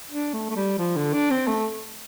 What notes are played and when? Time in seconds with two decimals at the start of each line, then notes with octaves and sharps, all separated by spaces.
0.11 D4
0.33 A3
0.50 A3
0.56 G3
0.79 F3
0.96 D3
1.13 D4
1.30 C4
1.47 A3